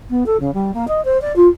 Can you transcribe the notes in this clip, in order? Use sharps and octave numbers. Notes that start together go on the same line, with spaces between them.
B3
A4
C#3
G3
A#3
D#5
C5
D5
F4